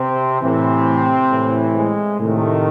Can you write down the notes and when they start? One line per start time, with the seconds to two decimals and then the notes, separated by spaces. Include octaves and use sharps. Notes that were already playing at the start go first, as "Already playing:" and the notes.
Already playing: C3 C4
0.42 A2 C3 E3 C4
1.31 A2 E3
1.75 G#3
2.19 A2 C3 D#3 A3